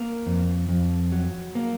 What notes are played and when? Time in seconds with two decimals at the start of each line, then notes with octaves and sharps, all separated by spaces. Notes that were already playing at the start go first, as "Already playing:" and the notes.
Already playing: A#3
0.26 F2
0.69 F2
1.12 F#3
1.55 A#3